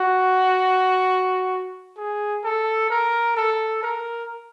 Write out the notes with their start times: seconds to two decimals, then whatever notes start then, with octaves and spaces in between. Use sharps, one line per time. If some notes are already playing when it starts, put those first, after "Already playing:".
Already playing: F#4
1.97 G#4
2.44 A4
2.90 A#4
3.36 A4
3.82 A#4